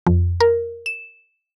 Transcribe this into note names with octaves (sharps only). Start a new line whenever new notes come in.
F2
A#4
E7